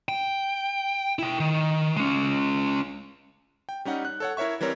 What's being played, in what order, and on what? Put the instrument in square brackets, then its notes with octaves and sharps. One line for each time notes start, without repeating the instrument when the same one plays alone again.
[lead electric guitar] G5
E4 G5
D#3
G#3 C#4
[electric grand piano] G5
G3 C#4 D#4 F#5
F#6
A4 C#5 F#5
E4 A#4 C#5 E5 C#6
E3 G3 C4 A#4 C#5